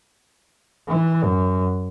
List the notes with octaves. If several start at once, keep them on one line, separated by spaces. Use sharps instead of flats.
E3
F#2